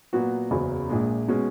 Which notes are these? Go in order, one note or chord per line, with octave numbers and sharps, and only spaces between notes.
A#2 F#3 B3 F#4
F#1 E2 C#3 F#3
A#1 A#2 G#3
B2 G#3 C#4